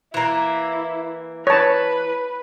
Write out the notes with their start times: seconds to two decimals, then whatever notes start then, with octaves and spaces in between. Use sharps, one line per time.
0.14 E3 A#3 E4
1.47 B4 C#5 A5